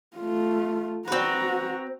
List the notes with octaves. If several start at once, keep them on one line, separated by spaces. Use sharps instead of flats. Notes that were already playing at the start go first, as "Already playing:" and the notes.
A3 F4
C4 F#4 B4 A#5